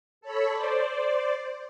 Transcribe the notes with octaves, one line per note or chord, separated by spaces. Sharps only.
A4 C#5 B5
C5 D5